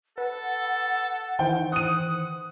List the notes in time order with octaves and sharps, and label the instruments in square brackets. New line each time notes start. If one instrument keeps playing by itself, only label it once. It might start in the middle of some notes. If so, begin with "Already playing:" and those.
[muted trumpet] A4 [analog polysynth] B4 [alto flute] F#5
[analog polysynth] D#3 E3 C5 [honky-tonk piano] G5
[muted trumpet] F#5 [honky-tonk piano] D#6 D#7